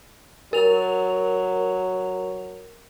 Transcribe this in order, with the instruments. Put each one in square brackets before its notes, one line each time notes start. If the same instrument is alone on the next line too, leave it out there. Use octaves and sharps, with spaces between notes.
[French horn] F#3 [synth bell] A#4 F7